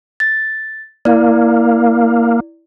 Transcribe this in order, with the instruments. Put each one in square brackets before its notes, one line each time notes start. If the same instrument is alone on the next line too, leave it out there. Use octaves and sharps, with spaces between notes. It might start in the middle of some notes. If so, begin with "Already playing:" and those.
[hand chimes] A6
[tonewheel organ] A#3 [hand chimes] E4 D5